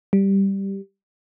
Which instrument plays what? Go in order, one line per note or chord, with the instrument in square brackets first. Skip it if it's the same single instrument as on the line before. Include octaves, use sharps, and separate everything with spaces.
[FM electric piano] G3